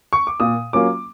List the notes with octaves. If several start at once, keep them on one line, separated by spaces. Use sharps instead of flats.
C#6
D6
A#2 D#6
F#3 A#3 C#4 F4 D6